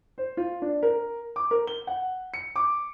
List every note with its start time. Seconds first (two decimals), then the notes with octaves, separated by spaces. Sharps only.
0.18 C5
0.37 F4
0.62 D4
0.83 A#4
1.36 D6
1.51 A#4
1.67 G7
1.87 F#5
2.34 C#7
2.56 D6